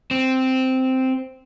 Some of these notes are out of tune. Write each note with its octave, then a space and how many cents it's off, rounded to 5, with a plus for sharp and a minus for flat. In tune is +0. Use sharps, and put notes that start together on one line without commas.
C4 -5